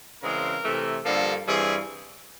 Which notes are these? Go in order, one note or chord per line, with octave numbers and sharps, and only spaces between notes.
C#3 E3 G#3 C4 A#4
C3 E3 A3
G2 D3 F3 A#3 A4
G2 E3 G3 C4 G#4